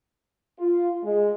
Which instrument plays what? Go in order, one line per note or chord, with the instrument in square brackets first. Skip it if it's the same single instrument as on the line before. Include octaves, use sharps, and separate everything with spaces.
[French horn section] F4
G#3